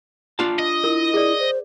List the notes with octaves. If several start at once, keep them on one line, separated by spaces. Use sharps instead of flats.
D4 F4 A5
D#5
E4 A#4
G#4 D5
C5